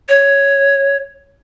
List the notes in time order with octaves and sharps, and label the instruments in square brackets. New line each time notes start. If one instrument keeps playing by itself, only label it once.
[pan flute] C#5